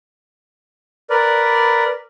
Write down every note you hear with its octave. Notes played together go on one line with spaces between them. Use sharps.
A#4 B4 D5